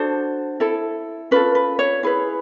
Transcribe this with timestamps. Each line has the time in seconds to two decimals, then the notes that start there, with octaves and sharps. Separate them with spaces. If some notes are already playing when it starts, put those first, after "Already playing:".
Already playing: D4 F#4 A4 C5
0.60 E4 A4
1.31 C#4 F4 A4 B4
1.55 B4
1.79 C#5
2.03 E4 G#4 B4